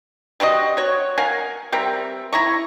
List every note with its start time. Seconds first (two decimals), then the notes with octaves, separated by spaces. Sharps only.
0.40 G3 C4 F#4 D#5
0.77 F#4 C#5
1.18 A#4 F5 F#5 G#5
1.72 G3 C4 A#4 E5
2.33 E4 A#5 C#6